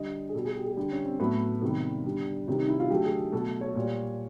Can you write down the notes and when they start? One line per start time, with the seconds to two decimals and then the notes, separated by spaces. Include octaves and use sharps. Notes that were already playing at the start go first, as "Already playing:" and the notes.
Already playing: D3 G3 D#5
0.29 G#4
0.34 B2 G3 A4
0.45 G#4
0.56 G4
0.66 G#4
0.77 D3 G3 G4
0.91 C#4
1.05 C4
1.19 A2 F#3 A3 B3
1.62 C3 D#3 G3 B3
2.05 D3 G3
2.48 C3 D#3 G3 C#4
2.58 D#4
2.69 E4
2.80 F4
2.90 D3 F#3 A3 G4
3.05 G#4
3.32 B2 F#3 A3 A4
3.61 C#5
3.75 A#2 G3